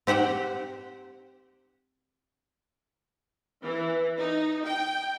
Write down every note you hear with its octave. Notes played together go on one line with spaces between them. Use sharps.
C4 G4 C5 F#5 G5
E3
D#4
G5